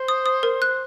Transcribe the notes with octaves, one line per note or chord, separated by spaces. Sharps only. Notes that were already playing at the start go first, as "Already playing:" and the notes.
Already playing: C5
D#6
D#6
A#4
F#6